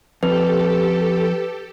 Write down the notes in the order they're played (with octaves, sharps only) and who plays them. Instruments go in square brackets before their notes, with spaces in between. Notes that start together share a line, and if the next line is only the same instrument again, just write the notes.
[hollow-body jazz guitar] F2 [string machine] G4 A4 [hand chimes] B4